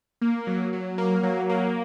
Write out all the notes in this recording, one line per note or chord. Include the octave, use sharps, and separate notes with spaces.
A#3
F#3
F#3
A#3
F#3
A#3